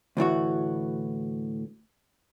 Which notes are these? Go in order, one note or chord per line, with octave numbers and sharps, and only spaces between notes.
D2 A2 E3 F#4